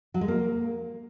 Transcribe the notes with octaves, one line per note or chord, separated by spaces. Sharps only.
F#3
G#3
A#3